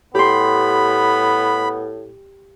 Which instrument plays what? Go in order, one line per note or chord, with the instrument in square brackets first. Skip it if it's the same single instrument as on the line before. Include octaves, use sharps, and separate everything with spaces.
[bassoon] A2 [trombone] B3 [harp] G4 C6 [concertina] B5